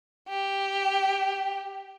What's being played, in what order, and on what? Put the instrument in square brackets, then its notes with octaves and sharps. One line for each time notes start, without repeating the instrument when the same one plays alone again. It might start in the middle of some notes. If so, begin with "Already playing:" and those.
[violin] G4